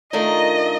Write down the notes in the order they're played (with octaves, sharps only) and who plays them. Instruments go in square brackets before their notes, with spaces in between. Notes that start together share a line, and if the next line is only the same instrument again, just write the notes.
[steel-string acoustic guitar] D#3 A3 D4 F4 A#4 [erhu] D#5